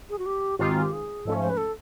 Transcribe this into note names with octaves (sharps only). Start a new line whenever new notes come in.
G#4
F#4
G4
G#2 D#3 G#3 C4 F4 G4
F#4
G4
G#4
G#2 F3 A3 C#4 A4
C5
B4
A4